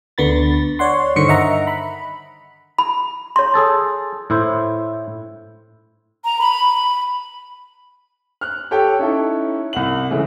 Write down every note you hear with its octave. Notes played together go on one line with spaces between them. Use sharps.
D2 D3 B3 B5 A6
C#5 D5 F#5 C6
G2 D3 D#3 C5 C#6 C#7
D#5 E5 F#5 A#5
B5
B5
C#5 C6
G#4 A4 A5
A2 E4 C5
A#5
B5
F6 F#6
G4 A4 C#5 G5
C#4 D#4 E4 A4
C2 F#5 F#7
C#3 E3 G#3 A3